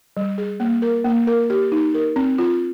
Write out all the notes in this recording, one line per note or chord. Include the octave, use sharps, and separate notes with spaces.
G3
G#4
A#3
A#4
A#3
A#4
G4
D#4
A#4
C4
F4